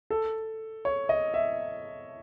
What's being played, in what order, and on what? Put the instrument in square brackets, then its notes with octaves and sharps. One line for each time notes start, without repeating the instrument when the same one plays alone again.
[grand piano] A4
C#5
D#5
E5